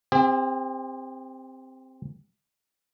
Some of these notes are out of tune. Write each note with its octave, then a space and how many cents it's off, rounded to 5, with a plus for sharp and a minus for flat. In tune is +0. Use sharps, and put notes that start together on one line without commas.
C4 +0 G4 +45